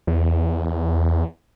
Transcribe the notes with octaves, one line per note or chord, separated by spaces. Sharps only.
E2